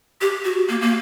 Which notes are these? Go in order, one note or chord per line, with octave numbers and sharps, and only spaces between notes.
G4
F#4
A#3
A#3